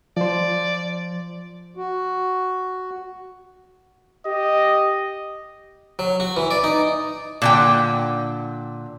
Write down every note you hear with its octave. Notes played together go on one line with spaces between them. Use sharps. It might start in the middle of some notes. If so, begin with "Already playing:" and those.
F3 C5 D5
F#4
G4 D#5
F#3
F#4
E3
D5
D#4
A#2 D3 G5